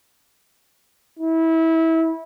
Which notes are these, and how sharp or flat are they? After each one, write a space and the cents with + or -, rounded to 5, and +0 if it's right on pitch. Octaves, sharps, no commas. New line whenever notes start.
E4 -25